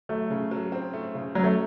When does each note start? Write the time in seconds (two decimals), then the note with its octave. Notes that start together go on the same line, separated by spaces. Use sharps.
0.09 F#3 A3
0.30 C#3
0.51 F#3
0.72 C4
0.93 A3
1.15 C#3
1.35 F#3 C#4
1.44 A3